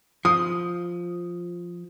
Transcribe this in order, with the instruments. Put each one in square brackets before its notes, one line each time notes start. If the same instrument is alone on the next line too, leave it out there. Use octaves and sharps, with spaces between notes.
[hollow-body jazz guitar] F3 [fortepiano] D#6